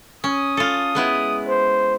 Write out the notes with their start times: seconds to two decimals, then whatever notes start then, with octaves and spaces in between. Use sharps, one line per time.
0.24 C#4 D#6
0.57 F4 A4
0.95 G#3 B3 E4
1.48 C5